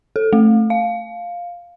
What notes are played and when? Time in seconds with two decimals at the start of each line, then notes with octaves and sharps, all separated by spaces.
0.16 A4
0.33 A3
0.70 F5